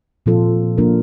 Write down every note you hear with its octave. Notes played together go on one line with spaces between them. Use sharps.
A#2 F3 C4 F4 A4
F3 A#3 D4 F4 A#4